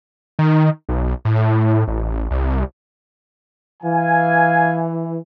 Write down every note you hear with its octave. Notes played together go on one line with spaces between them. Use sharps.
D#3
B1
A2
A1
C2
E3 F5 G#5